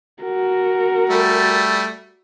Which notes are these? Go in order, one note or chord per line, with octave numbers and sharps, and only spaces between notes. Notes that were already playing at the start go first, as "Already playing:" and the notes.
F#4 A#4
G3 A3